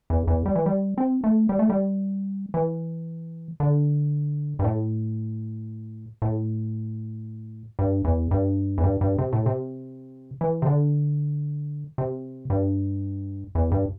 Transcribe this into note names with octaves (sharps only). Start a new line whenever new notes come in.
E2
E2
G3
E3
G3
C4
A3
G3
A3
G3
E3
D3
G2
A2
A2
G2
E2
G2
E2
G2
G2
C3
A2
C3
E3
C3
D3
C3
G2
E2
G2